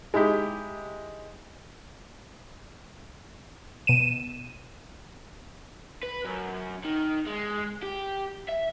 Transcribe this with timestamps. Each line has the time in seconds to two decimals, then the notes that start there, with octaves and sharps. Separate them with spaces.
0.14 G#3 D#4 E4 G4
3.87 B2 D#7 E7
6.03 B4
6.25 F#2
6.85 D#3
7.27 G#3
7.82 G4
8.48 E5